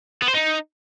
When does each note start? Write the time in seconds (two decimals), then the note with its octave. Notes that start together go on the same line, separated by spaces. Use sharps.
0.22 B3
0.28 C5
0.34 D#4